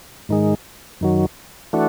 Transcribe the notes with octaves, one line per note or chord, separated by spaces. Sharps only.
G#2 D#3 G#3
F#2 D#3 F#3
E3 A3 D4 F#4